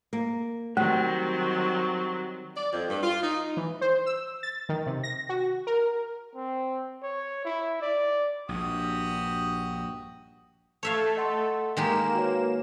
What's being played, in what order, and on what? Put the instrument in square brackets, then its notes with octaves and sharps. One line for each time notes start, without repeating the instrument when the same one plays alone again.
[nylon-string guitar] A#3
[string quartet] D#3 F#3 C4 [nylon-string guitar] G3 [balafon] A3
[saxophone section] D5
F2
G2
F4
D#4
[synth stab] E3
C5
E6
A6
D#3
C3
A#6
F#4
A#4
[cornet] C4
C#5
E4
D5
[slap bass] A#1 G2 [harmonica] F#4 G4 D#6
[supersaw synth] A3 A4 [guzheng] C#5 E5 F5 [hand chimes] A5
[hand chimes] D#5 F#5 C6
[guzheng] D#3 G#3 G4 [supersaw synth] A#3 E7 [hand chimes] G5 G#5 A#5
[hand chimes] F#4 B4 C#5